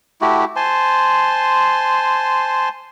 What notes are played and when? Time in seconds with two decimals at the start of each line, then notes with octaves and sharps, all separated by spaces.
0.21 A3 E4 F#4 G4
0.56 C5 G#5 A5 C6